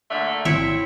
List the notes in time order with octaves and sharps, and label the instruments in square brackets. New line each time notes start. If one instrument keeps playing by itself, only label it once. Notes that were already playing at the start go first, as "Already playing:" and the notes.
[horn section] A#2 D3 A3
[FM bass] G#1 [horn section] C4 [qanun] E4 C#5 E5